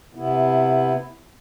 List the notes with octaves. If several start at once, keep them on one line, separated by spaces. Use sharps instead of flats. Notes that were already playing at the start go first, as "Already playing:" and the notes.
C3 B3 E4